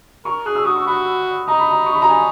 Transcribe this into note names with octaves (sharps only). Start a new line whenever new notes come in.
A#4 C#6
G#4 F#6
E6
F#4 D#6
C#6
F#4 B5
D#4 A#5
B5
A#5
C#6
B5
A#5
G#5